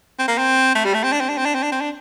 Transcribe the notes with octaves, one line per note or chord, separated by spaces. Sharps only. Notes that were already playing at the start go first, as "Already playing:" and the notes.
C4
A#3
C4
A3
G3
A3
C4
D4
C4
D4
C4
D4
C4
D4
C4
D4